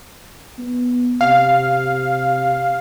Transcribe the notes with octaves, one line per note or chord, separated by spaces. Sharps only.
B3
C3 F5